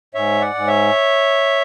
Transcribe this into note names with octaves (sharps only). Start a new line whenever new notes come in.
G#2 C#5 E5
D5 F#5
G#2
C#5 E5